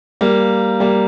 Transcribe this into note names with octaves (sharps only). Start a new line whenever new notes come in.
G3 A#3
G3 A#3